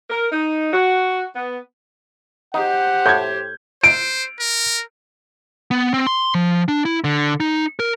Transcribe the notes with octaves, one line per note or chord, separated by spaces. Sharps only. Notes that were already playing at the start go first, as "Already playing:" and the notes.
A#4
D#4
F#4
B3
D#4 G4 C5 F#5
A2 G6 G#6
C5 D7
A#4
B3
C4
C6
F3
D4
E4
D3
D#4
A#4